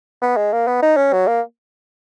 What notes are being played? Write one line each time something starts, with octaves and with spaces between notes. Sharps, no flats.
B3
G#3
A#3
B3
D#4
C#4
F#3
A#3